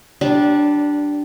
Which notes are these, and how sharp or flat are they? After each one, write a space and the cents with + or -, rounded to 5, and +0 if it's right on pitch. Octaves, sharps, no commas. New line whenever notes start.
G3 -20 D4 +0